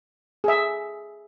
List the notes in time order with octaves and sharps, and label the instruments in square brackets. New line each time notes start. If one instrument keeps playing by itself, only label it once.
[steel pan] G#4 E5